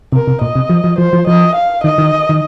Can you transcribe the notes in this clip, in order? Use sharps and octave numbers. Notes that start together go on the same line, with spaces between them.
C3 A#4
C3
A#2 D#5
C3
F3
F3
F3 C5
F3
F3 D#5
F5
D#3 D#5
D#3
D#3